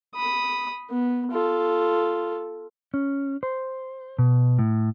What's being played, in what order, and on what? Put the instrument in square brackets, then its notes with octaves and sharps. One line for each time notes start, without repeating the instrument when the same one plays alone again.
[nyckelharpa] B5 D#6
B3
F4 A4
[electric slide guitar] C#4
C5
B2
A2